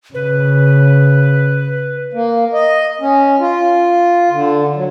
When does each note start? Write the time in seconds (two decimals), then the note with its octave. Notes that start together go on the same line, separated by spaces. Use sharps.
0.14 C#3 B4
2.14 A#3
2.53 D#5
3.01 C#4
3.40 F4
4.30 D3
4.75 F#3